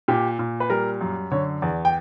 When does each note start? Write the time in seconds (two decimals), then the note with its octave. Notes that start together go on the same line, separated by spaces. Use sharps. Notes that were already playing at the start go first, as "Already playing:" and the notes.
0.08 A#2 G4
0.39 A#2
0.60 B4
0.70 G3 A#4
1.01 F#2
1.31 D3 C#5
1.62 E2 D5
1.85 G5